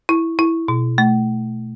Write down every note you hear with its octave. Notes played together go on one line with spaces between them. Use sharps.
E4
E4
B2
A3